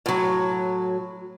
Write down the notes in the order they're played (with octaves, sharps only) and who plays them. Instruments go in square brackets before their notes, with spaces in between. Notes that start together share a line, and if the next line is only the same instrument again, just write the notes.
[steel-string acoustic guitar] A2 F#3